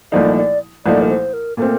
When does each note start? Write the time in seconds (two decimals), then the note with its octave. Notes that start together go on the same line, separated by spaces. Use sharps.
0.12 C2 A#2 F3 A3 D#4 D5
0.37 D5
0.85 C2 A#2 F3 A3 D#4 D5
1.02 A#4
1.09 C5
1.33 A#4
1.57 A#2 A3 C4 A#4